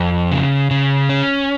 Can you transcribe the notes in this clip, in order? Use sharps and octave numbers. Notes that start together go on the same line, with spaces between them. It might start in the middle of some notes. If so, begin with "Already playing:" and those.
Already playing: F2
C#3
C#3
C#4